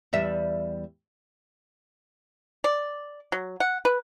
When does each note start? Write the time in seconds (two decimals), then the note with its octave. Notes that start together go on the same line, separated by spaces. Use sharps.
0.13 E2 G3 E5
2.64 D5
3.32 F#3
3.60 F#5
3.85 B4